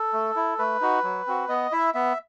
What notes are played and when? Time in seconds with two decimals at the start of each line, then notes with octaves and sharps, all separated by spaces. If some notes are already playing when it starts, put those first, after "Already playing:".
Already playing: A4
0.13 A3
0.36 E4
0.59 A3 B4
0.81 D#4 F#4
1.04 F#3
1.27 C4 F#4
1.49 B3 D#5
1.72 E4 E5
1.94 B3 E5